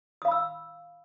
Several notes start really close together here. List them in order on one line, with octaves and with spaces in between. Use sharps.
D#6 F5 B5 E6